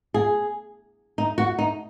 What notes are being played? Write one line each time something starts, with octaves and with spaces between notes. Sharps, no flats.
G#4
D#4
F#4
D#4